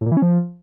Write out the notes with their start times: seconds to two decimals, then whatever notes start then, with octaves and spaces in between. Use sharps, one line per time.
0.01 A2
0.06 A#2
0.12 E3
0.17 C#4
0.22 F3